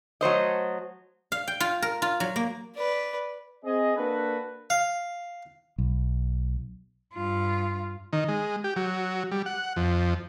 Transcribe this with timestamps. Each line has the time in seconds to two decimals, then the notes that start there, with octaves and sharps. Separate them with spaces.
0.21 F#3 A3 C5 D#5
1.32 F5
1.48 G5
1.60 F4
1.82 A#4
2.02 F4
2.20 F#3
2.36 A#3
2.76 B4 D5
3.64 C4 G#4 D#5
3.96 A#3 D4 F#4 A4 B4
4.70 F5
5.78 B1
7.14 G2 F4
8.13 D#3
8.28 G#3
8.64 G4
8.76 F#3
9.32 G3
9.46 F#5
9.76 F2